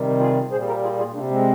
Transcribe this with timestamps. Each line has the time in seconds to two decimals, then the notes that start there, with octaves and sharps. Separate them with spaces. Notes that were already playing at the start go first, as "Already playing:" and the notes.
Already playing: C3 D#3 G3
0.20 F4 G#4
0.51 A#2 G#4 C5
0.55 G3
0.67 G4 A#4
0.83 F4 G#4
0.98 F4 G#4
1.14 C3 G3 A#3 D4
1.31 G#3 C4